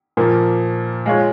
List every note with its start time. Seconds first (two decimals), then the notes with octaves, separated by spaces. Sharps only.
0.17 A#2 F3 A#3
1.06 G#3 F4 C#5